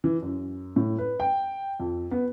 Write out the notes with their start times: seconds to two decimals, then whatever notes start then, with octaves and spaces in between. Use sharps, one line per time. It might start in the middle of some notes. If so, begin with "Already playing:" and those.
0.04 E3
0.22 F#2
0.76 A2
0.98 B4
1.20 G5
1.80 F2
2.11 B3